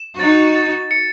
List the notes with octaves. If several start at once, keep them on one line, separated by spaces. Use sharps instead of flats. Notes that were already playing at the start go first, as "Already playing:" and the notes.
Already playing: E7
D#4 F#4 A6
A6
C#7